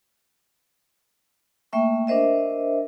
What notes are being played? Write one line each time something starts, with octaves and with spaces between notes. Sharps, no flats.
A3 A#3 E5 G5 C#6
D4 A#4 C5 D#5 E5